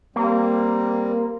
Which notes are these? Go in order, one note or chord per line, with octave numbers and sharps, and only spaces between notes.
G3 A#3 C4